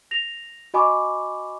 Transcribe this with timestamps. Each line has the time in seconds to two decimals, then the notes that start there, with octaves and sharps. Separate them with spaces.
0.11 A#6 F7
0.74 F#4 D#5 G#5 B5 C#6 D6